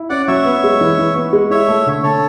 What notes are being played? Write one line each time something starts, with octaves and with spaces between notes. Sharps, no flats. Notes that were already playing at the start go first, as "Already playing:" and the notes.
Already playing: E4
C#4 D5 F#5
F#3 C#5 E5
B3
G#3
E3
E3
B3
G#3
E4 C#5 E5
A3
D3
D3 A4 C#5